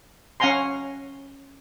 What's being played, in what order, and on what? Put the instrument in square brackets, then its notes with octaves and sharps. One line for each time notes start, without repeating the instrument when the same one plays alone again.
[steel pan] C#4 F5 F#5 G#5 A#5 C6